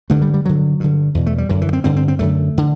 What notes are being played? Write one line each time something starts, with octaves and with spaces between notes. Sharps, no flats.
G2 D3 A3
G3
G3
G2 D3 F#3
G2 D3
E2 B2
A3
G3
F#2 D3 E3
E3
C4
G2 D3 C4
C4
C4
F#2 D3 A3
D3